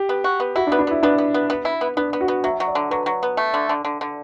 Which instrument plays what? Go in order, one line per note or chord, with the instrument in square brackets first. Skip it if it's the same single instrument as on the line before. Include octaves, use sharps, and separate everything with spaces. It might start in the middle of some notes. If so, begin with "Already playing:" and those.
Already playing: [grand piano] G4
[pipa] B3
F#4
B3
[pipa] E4 [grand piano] F#4
[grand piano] D4
[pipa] B3
[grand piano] D4
[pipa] B3 [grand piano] E4
[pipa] B3 [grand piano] D4
[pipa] B3
B3
B3
E4
B3
[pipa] B3 [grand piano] D4
[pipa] B3
[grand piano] F#4
[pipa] B3
[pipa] F#3 [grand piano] E5
[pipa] F#3
[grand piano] D5
[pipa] D3
[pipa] F#3 [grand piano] B4
[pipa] F#3
B3
A3
D3
D3
D3
D3